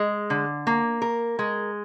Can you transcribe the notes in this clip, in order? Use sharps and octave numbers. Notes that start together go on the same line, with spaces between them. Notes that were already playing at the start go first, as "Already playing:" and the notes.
Already playing: G#3
D3
A#3
A#4
G#3